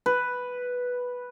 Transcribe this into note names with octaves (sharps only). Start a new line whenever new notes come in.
B4